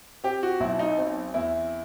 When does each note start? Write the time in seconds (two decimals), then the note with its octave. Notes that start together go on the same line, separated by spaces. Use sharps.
0.24 C4 G4
0.43 F#4
0.60 B1 E4
0.79 D#4
0.98 C4
1.34 E2 E4